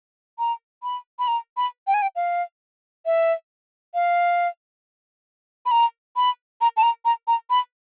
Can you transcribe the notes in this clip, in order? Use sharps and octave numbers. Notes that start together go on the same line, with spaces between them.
A#5
B5
B5
A#5
B5
G5
G#5
G5
F5
E5
F5
B5
A#5
B5
A#5
A5
A#5
A#5
A#5
B5